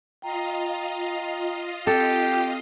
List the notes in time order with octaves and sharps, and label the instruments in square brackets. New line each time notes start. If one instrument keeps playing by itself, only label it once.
[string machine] F4 D#5 F5 [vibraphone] G5 A#5
[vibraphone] C4 [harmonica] G4 [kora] A4